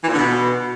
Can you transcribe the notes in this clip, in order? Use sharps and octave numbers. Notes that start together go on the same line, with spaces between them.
E3
A#2
D3
B2